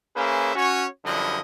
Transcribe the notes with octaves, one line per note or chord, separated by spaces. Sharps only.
A#3 C#4 G#4 B4 C5 E5
C#4 F#4 C#5
F#2 D3 F3 G3 E4 D#5